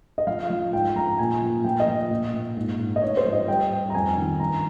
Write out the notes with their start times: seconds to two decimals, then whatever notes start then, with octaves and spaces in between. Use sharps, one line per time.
0.18 D#5
0.27 F3 F5
0.50 F3
0.72 G#2 G5
0.96 F3 A#5
1.19 A#2 G#5
1.41 F3
1.64 F3 G5
1.80 D#5
1.88 F3
2.11 A#2
2.34 A#2
2.57 G#2
2.79 G#2
2.96 D#5
3.02 G#2 C#5
3.17 C5
3.25 F3
3.33 D#5
3.48 G3 G5
3.71 G3
3.90 A#5
3.94 F2 G#5
4.17 D#3
4.40 G2 A#5